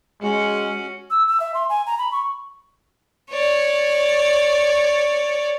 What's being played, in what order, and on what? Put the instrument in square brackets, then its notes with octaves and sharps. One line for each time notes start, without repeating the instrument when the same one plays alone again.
[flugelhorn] G#3 [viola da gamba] C#4 F#4
[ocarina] E6
E6
E5
C6
G#5
A#5
B5
C#6
[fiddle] C#5 D5